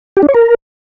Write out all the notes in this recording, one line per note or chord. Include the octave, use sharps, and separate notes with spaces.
G4
D4
C#5
A#4